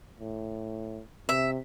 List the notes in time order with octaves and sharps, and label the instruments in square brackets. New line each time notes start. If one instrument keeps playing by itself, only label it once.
[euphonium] A2
[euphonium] C3 [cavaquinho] E5